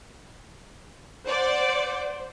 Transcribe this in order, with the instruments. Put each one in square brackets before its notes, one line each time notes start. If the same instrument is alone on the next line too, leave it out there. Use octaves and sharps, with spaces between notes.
[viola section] C5 [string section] D5 F#5